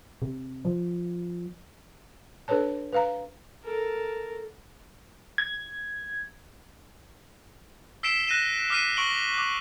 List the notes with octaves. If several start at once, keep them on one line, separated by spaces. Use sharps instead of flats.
C3
F3
D4 A4 B4 C#5 A5
B4 F5 A#5
A4 A#4
G#6
E6 B6 C7 D7 E7 G7
F#6 A#6 D#7 E7
D6 F6 B6 C7 D#7
C#6 D7 F#7 G7
D6 F#6